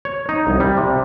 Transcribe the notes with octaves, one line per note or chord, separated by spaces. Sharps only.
C#5
D#4
C2
G3
C3